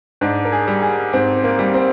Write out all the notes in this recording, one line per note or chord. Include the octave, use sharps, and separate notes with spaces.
G#2 D4
A#4
G#4
G3
G#4
G#2 C4
A#3
G3
C4